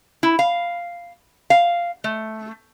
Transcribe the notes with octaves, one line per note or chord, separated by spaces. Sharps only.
E4
F5
F5
A3